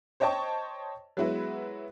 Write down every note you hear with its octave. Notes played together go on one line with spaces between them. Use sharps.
C5 C#5 D#5 G5 A5 C#6
F#3 G#3 B3 E4 F#4 B4